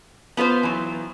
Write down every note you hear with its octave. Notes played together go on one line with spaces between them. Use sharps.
B3 F4 B4 C5
E3 F#3